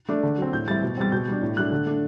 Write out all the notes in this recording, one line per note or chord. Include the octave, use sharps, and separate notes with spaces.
A3 D4
D3
F#3 C4
A2 G6
G3 C4 E4 A6
B2
G3 C4 A6
B2 G6
G3 D4
A2
F#3 A3 D4 F#6
D3
A3 D4